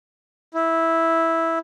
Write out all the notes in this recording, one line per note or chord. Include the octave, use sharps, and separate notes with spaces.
E4